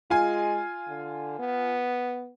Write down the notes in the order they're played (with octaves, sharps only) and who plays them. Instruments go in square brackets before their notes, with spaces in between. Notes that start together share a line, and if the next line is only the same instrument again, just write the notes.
[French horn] G#3 [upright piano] F4 G#5
[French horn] D3
B3